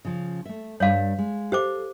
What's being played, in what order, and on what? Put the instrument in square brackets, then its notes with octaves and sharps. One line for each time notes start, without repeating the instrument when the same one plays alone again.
[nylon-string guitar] C#3 F3
A3 E5
[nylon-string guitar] G2 G3 [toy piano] C#5 F5
[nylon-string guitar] G#3
[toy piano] G4 C5 D6 [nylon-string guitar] A4 F5